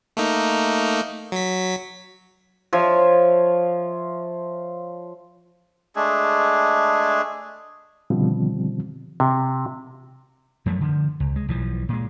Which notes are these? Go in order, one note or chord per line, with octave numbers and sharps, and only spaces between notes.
A3 A#3 D#4
F#3 B6
F3 C#5 E5
G#3 A3 D4 G#4
B2 D3 D#3 F3 G3 C4
C3
F#2 F3 F#3 A3
D3 F3
C#2
G#3
B1 E3 F3
A#2 G#3